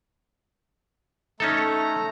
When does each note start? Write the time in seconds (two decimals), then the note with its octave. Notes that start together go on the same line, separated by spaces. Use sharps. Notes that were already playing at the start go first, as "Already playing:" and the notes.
1.40 A3 C#4 D#4 A4 A#5